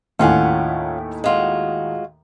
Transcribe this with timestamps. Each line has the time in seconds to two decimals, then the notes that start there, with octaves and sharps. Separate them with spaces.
0.19 D#2 A2 C#4 F4 F#5 G#5
1.24 G#3 F4 F#4